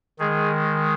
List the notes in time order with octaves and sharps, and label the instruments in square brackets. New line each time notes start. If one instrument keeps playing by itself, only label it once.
[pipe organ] D#3 G#3 G#4